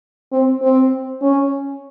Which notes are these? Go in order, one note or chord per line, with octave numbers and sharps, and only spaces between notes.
C4
C4
C#4